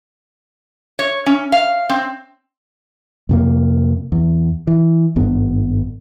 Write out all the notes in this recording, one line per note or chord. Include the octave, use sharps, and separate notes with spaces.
C#5
C#4
F5
C4
F2 C3 A#3
E2
E3
G#1 G2 B3